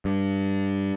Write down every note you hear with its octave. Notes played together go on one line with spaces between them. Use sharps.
G2